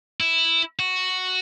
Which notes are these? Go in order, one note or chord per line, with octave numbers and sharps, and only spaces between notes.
E4
F#4